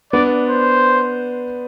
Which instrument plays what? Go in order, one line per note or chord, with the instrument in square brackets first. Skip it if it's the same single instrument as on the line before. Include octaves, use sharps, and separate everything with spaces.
[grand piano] B3 D4 [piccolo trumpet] D5
[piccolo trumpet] C5